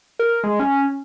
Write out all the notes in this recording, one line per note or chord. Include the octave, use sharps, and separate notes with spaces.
A#4
G#3
C#4